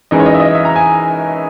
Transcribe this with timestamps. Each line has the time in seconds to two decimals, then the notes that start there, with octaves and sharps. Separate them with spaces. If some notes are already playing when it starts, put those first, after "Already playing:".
0.11 F#2 E3 G#3 D#4 D#5
0.20 C#5
0.26 D#5
0.34 E5
0.40 D#5
0.54 E5
0.65 A#5
0.76 G#5